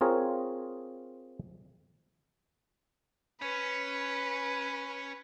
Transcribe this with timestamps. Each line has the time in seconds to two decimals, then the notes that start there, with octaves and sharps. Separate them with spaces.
0.01 C4 F4 G#4 A#4 C#5
3.42 C#4 B4